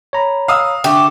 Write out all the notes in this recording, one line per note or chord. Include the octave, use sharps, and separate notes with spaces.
C#5 A#5 B5
F5 D#6 E6
D3 A3 G4